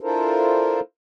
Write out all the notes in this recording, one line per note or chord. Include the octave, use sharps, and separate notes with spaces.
D4 E4 F4 A4 A#4 C5